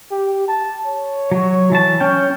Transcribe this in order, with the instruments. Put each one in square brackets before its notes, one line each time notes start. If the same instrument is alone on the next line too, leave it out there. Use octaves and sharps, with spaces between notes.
[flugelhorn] G4
A5
C#5
[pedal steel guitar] F#3
E3 A5
C#4 G5